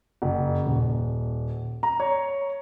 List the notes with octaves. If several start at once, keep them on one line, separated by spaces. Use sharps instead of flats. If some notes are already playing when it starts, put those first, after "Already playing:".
F#1
D#1
A#5
C#5